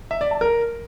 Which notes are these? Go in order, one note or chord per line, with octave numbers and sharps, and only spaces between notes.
E5
D5
A5
A#4